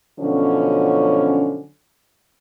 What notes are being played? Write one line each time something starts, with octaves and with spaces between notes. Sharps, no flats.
B2 D3 F3 F#3 C#4